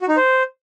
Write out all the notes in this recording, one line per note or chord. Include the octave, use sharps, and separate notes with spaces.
F#4
D#4
C5